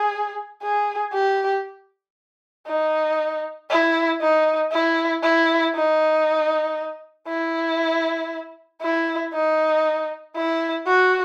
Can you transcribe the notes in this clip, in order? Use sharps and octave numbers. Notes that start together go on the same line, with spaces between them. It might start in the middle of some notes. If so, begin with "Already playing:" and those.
Already playing: G#4
G#4
G4
D#4
E4
D#4
E4
E4
D#4
E4
E4
D#4
E4
F#4